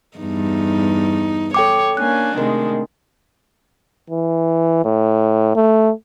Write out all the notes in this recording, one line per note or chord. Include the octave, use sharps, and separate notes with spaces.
E2 G2 D#4
A4 C#5 G5 D6
A#3 C#4 D4 G#5 F#6
C3 D#3 G#3 A3 A#4
E3
A2
A3